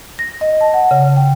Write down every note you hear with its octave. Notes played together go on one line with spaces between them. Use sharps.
A#6
D#5
A5
F#5
C#3
G5